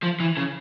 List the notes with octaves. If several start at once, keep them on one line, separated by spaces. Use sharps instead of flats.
F3
E3
C#3